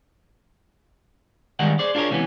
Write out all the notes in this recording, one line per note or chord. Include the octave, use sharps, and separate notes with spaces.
G2 D#3 G3 G#3 A#4 F#5
G#4 C5 D5
D4 F4 G#4 A#4 C#5
C#2 C3 E3 B3 C#4